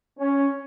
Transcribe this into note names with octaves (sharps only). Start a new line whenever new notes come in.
C#4